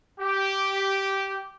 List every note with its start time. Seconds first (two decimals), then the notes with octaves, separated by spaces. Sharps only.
0.20 G4